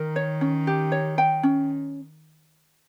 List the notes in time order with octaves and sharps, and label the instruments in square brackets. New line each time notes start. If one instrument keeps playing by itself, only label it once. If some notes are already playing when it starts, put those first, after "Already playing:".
Already playing: [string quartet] D#3 [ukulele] A#4
[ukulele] C#5
C#4
G4
C#5
G5
C#4